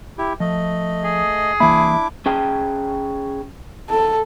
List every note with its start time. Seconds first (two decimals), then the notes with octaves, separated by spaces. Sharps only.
0.18 E4 G4
0.40 F3 A3 D#5
1.04 G#4
1.60 C2 E3 A#3 D4 E4 E5 B5 D6
2.26 C#4 G#4 G5 A5
3.90 A4